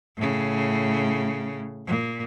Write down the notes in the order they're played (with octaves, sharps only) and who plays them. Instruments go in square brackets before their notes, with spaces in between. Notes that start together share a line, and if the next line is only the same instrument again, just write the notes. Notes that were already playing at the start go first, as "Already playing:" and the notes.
[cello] A2 C#3
A#2